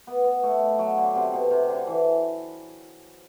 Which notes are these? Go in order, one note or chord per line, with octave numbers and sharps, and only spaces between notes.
B3
B3
A3
F#3
D3
C3
B2
C3
D3
E3